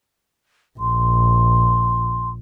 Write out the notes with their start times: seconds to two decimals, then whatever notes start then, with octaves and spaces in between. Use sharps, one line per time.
0.79 A#1 C6